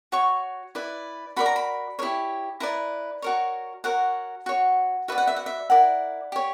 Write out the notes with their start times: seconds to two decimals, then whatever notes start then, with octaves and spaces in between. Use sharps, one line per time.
0.12 F#4 C#5 C#6
0.75 E4 B4 D5
1.36 F#4 A#4 D5 B5
1.46 A#5
1.56 B5
1.99 E4 G4 A#4 C#5
2.60 E4 B4 D5 A#5
3.22 F#4 A#4 C#5
3.84 F#4 A#4 C#5 F#5
4.46 F#4 C#5
5.08 F#4 B4 D5 E5
5.18 F#5
5.27 E5
5.36 F#5
5.46 E5
5.70 E4 A#4 D5 F#5
6.32 G4 C#5